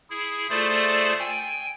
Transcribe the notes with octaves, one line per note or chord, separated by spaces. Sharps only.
E4 G#4
A3 F4 G#4 A4 C5 D5
G5 G#5